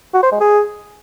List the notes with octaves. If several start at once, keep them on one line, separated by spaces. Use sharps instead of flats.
F#4
C5
G#3
G#4